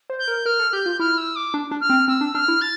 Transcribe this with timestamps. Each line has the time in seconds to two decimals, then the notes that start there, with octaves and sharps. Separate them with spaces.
0.10 C5
0.19 G6
0.28 A#4
0.46 A#4 F6
0.59 A4
0.73 G4 G6
0.86 F4
1.00 E4 F6
1.18 E6
1.36 D6
1.54 D4
1.71 D4
1.81 F6
1.90 C4
2.08 C4 E6
2.21 D4
2.35 D4 F6
2.48 E4
2.61 A6